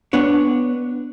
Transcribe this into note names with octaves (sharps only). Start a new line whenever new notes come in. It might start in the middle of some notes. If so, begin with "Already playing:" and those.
B3 D4 C#5